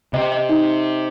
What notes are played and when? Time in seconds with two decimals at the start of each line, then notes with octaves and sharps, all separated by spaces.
0.13 C3 C4 D#5
0.32 D#5
0.49 D#4